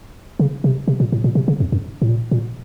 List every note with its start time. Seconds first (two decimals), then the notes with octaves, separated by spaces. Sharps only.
0.39 C#3
0.64 C3
0.88 C3
1.00 A#2
1.12 A2
1.24 A#2
1.35 C3
1.48 C#3
1.60 F2
1.72 F#2
2.02 A2
2.08 A#2
2.31 A#2